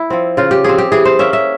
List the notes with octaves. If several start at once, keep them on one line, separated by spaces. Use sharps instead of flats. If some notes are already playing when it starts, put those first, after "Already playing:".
Already playing: E4
F3 C4
C#3 F4
G4
F3 C4 G#4
G4
E3 G#4
C5
A#3 C#4 E5
E5